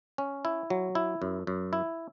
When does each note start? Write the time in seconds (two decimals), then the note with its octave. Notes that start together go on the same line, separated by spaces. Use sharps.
0.18 C#4
0.45 E4
0.70 F#3
0.95 E4
1.22 F#2
1.47 F#2
1.73 E4